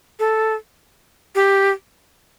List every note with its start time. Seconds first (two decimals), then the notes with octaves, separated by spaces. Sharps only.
0.19 A4
1.35 G4